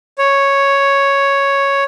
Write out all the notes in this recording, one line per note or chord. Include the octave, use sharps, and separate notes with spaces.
C#5